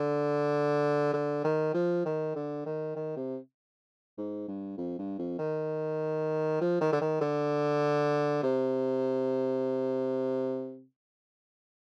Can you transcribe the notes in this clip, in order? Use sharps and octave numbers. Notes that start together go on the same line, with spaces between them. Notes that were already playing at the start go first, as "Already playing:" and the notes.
Already playing: D3
D3
D#3
F3
D#3
D3
D#3
D#3
C3
G#2
G2
F2
G2
F2
D#3
F3
D#3
D3
D#3
D3
C3